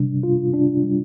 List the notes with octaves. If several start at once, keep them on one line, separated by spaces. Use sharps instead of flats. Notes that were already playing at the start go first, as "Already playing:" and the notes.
Already playing: C3 G3 D4
F4
D4
G3